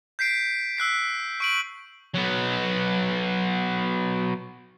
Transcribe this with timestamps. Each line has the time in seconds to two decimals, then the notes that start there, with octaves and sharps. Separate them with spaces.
0.19 G6 B6 C7 D7
0.77 E6 F#6 B6 C7
1.40 C#6 D7 F#7
2.14 F#3 B3